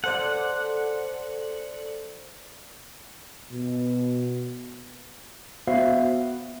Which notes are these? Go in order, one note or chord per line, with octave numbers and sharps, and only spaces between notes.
A4 C5 D5 F#5
B2
B3 F#4 C5 E5 F5